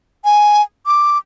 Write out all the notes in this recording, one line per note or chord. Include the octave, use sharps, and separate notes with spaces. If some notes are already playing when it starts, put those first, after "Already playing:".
G#5
D6